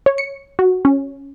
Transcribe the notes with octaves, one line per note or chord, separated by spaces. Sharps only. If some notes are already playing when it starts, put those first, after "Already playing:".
C#5
C#7
F#4
C#4